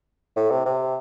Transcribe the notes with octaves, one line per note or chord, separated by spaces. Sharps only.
A2
C3
C3